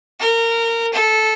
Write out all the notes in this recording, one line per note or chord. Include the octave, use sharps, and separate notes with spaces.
A#4
A4